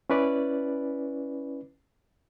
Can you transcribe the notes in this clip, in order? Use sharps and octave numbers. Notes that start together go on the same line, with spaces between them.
C#4 E4 B4 D5